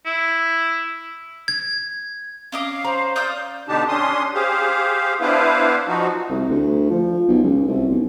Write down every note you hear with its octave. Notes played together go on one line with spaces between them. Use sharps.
E4
G#6
C#4 D#5 F5 D6
C5 A#5
D5 F5 D#6 G6
B2 D3 D4 D#4 G4 A5
C#4 D4 C6 D#6
G4 G#4 C5 F5
B3 D4 E4 B4 C5 F5
F3 D#4 F#4
C2
D2
F3
B1
C#2
C2
B1